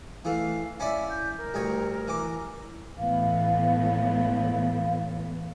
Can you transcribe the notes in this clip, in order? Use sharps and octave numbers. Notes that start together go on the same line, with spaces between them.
E3 A3 F5
C#4 E4 D5 E5
G6
A#4
D2 G2 C#5
E3 D6
A2 E3 B3 F5